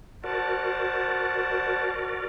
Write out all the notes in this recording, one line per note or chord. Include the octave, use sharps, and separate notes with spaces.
F#4 A#4 C5 D5 F#5 A5